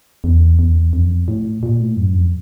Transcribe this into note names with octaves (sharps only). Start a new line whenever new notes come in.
E2
E2
F2
A2
A#2
A2
F#2
F2